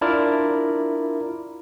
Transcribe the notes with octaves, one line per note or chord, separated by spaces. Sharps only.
D4 E4 F4 A#4 D5